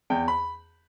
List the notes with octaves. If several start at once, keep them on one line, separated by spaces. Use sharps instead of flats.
E2 G5
B5